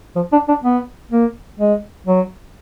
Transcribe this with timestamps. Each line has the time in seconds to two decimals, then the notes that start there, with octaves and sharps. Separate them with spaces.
0.16 F3
0.32 D4
0.48 D4
0.64 B3
1.11 A#3
1.59 G#3
2.07 F#3